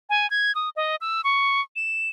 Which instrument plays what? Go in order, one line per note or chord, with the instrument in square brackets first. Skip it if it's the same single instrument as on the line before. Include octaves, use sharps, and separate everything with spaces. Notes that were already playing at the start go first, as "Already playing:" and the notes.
[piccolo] G#5
G#6
D#6
D#5
E6
C#6
E7